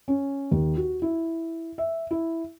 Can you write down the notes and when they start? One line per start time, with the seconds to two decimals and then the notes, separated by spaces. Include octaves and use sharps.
0.08 C#4
0.51 D#2
0.77 F#4
1.02 E4
1.78 E5
2.11 E4